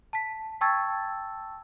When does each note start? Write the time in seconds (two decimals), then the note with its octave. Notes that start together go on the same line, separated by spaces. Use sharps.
0.13 A5 B6
0.61 G5 A5 C#6 E6 G#6 A6